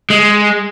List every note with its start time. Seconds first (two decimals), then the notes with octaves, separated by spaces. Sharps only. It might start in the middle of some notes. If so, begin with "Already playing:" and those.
0.10 G#3